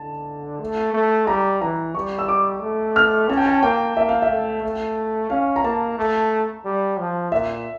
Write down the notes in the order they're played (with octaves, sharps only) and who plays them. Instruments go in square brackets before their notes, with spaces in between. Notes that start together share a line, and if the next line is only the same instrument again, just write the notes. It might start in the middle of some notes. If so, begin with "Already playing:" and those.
Already playing: [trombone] D3 [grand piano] A5
[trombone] A3
A3
[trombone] G3 [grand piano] A#5
[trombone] E3 [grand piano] A#5
[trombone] G3 [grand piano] C#6
[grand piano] E6
D6
[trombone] A3
[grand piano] F6
[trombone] C#4 [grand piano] A5
[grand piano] G5
A5
[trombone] A#3 [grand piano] G5
[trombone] A#3 [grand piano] E5
[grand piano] F5
E5
[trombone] A3
A3
[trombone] C#4 [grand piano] F5
[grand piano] A#5
[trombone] A#3 [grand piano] A5
[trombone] A3
G3
F3
[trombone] A#2 [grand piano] E5